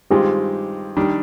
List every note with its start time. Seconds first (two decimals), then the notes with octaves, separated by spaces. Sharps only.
0.10 G2 D#3 G#3 C4 F4 G4
0.97 D#3 G3 D4